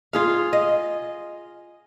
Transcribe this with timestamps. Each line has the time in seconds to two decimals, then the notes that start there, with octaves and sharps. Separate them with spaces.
0.13 F4 G#4 F5
0.53 D#5